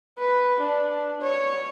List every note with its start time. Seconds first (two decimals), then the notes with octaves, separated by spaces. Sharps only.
0.18 B4
0.60 D4
1.21 C#5